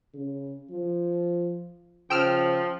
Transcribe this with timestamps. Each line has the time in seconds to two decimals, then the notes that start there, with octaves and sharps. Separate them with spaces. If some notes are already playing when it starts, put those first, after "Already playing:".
0.14 C#3
0.70 F3
2.10 C#3 F3 G5 E6 F6